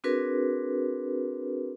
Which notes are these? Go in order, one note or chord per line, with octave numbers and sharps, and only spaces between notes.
C4 D4 F#4 G#4 A#4 B4